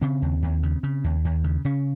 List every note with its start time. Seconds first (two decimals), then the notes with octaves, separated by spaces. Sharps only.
0.01 C#3 C4
0.22 D#2
0.42 D#2
0.63 C#3
0.83 C#3
1.04 D#2
1.25 D#2
1.44 C#3
1.65 C#3 C#4